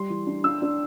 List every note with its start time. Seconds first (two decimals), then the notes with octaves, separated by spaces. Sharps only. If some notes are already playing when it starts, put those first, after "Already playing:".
Already playing: G3 C6
0.10 E3
0.27 D4
0.44 D4 E6
0.62 D4